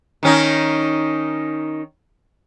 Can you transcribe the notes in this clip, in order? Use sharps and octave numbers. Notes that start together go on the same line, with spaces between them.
D#3 C#4 D#4